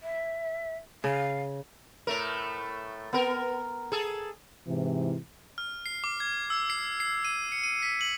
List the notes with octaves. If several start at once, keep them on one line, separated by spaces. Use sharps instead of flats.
E5
C#3 F5
A2 A3 A#4
B3 A#4
G#4 A4
G#2 C3 E3
F6
C7
D6
G#6
E6
C7
C7
D#7
C#7
D#7
B6
F#7